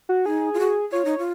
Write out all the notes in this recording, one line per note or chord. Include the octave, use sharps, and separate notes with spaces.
F#4
D#4 G#4
F4
F#4
F4 C#5
D#4
F4